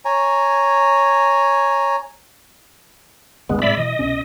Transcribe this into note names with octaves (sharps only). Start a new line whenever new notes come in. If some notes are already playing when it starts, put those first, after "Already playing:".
C#5 G#5 A#5
G1 C#2 G2 G#3 B3
A2 C3 G#3 D5 E5 B5
B2 E3 D#5
C2 B2 C#4